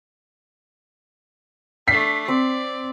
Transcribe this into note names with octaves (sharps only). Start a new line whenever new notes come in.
A3 D4 B6 C7
C4 D5